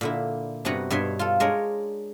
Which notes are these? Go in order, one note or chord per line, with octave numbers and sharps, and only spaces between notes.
A#2 D3 E4
G2 C3 B3 F#4 F#5 A#5
G2 B2 C#5 E5 C6
F4 A4
G#3 D4 A#4 C#5